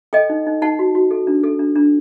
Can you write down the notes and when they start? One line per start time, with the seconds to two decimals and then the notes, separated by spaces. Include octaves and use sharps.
0.13 A4 D#5 G5
0.30 D#4
0.47 D#4
0.62 D#4 F#5 A5
0.79 F#4
0.95 F#4
1.11 A4
1.27 D4
1.44 A4
1.59 D4
1.76 D4